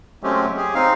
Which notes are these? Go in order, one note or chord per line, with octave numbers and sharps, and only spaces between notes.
F#3 G#3 A3 C4 C#4 G4
G4 G#4
C4 D#4 F5